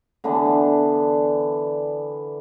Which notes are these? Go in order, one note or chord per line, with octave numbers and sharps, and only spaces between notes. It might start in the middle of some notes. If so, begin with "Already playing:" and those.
D3 E3 B3 D4